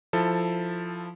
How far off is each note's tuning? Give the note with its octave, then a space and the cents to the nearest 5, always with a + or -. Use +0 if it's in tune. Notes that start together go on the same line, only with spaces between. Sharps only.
F3 +0 E4 +0 A4 +10